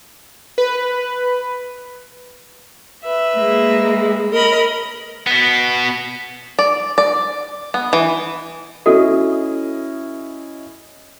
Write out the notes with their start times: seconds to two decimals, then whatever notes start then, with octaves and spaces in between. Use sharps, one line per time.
0.58 B4
3.04 B4 E5
3.36 G#3 A#3
4.31 A#4 D#5 B5
5.27 B2 B3
6.59 D5
6.98 D5
7.74 B3
7.93 E3
8.86 C#4 E4 F#4 A4 D#5